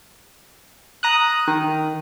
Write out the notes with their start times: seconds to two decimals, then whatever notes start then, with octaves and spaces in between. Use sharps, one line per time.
1.03 A#5 D#6 F#6
1.48 D#3